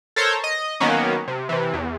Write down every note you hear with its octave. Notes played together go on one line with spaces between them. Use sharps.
A4 A#4 C5 C#5
D#5
D#3 F#3 A#3 B3 C#4
C3
C3 E3
E2